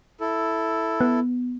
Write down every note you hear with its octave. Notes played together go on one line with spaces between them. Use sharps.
E4 A4
B3